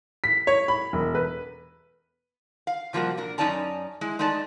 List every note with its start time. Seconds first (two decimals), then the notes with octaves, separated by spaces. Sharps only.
0.24 B6
0.47 C#5
0.68 B5
0.93 E1
1.15 B4
2.67 F5
2.93 C3 F3 G3 A#3 F#4
3.17 A#2 D4 A#4
3.38 F#2 C#4 D#4 D5 A5 A#5
4.01 G#3 E4
4.19 G#3 A3 D#4 D5 A5